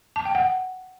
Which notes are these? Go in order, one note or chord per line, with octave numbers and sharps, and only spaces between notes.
A5
G5
F#5